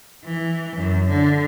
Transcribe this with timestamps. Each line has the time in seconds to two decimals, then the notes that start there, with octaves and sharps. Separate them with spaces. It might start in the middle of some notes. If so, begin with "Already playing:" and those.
0.25 E3
0.77 F#2
1.09 D3